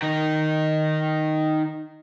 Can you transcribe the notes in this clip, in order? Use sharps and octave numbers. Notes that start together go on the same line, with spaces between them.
D#3 D#4